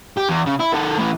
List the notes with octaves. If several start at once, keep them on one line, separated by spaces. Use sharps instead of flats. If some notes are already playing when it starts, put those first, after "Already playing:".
G4
E2
C#3
E4
D#3 A4
A2 E3